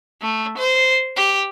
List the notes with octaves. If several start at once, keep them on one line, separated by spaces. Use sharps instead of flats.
A3
C5
G4